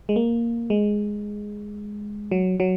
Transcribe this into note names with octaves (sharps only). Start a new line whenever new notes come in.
G#3
A#3
G#3
F#3
F#3